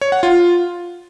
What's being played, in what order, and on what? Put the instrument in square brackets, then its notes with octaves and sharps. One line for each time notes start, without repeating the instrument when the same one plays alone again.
[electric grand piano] C#5
F#5
F4